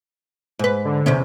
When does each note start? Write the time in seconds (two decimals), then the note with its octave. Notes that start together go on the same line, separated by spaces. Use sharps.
0.59 G#2 B4
0.85 D3
1.06 E2 C3 C#4